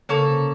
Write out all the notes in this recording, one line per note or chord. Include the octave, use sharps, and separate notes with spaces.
C#3 A#3 C#4 A4
C3